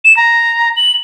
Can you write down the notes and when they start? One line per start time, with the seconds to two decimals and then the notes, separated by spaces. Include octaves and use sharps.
0.04 E7
0.17 A#5
0.77 F#7